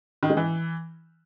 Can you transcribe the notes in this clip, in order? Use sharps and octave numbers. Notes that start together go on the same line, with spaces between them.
D#3
G#3
E3